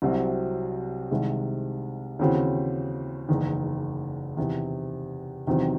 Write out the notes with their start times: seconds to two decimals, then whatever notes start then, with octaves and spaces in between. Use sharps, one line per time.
0.02 C2 C3 F#3 C4 F#4
1.11 C2 C3 D#3 G#3
2.19 D#2 C#3 E3 C4 F#4
3.29 F#1 E2 D#3
4.37 E2 C3 D#3
5.47 E2 C3 D#3 F#3 C4